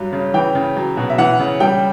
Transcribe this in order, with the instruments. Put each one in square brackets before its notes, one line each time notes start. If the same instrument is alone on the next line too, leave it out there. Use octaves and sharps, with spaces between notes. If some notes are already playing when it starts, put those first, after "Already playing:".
Already playing: [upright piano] G2 F#3
C#3
E3 G5
C#3
F#3
B2
E5
E3 F#5
C#3
G3 G5